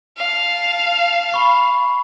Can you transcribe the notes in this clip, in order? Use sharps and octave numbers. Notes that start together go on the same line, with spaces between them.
F5 A5
B5 C#6 C7